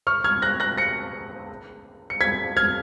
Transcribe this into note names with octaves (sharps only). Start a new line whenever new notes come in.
C#6 F6
F6 G#6
F#6 A#6
F#6 A#6
A#6 C#7
C#7
G#6 B6
F6 G#6